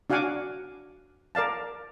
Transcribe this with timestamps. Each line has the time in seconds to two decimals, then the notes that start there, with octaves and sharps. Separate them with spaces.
0.10 D4 F#4 F5 F#5 G#5 D6
1.35 A#4 D5 F5 A5